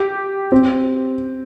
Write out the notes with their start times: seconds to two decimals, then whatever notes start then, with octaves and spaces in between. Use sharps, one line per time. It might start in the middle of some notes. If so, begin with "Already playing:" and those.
Already playing: G4
0.52 C4